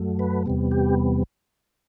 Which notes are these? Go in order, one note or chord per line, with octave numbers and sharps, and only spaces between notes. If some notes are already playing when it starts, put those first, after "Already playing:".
Already playing: F#2 F#3 A3
B4
E2 C3 G3 B3
G4